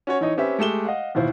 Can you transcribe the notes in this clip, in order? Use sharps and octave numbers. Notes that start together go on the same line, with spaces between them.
C#4 F#4 C#5
E3 D#4 C#5 D#5
C4 C#4 G4 B4 E5
G#3 A3 G4 E7 G7
D#5 F5 F#5
D#2 B2 E3 E4 F4 C5